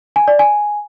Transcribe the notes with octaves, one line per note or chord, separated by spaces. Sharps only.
G#5
D5
G#5